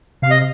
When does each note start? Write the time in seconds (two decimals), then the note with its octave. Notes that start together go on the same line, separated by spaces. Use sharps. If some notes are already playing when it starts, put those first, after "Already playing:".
0.22 C3 F5
0.30 D#5